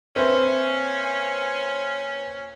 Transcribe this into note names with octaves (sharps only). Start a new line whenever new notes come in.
A#2 C4 C#4 B4 E5